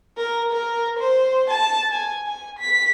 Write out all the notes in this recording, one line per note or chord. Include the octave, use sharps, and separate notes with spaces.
A#4
A#4
C5
A5
G#5
G#5
B6